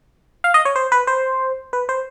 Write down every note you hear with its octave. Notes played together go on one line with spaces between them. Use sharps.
F5
D#5
C#5
C5
B4
C5
B4
C5